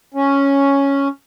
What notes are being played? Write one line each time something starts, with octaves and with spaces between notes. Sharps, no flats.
C#4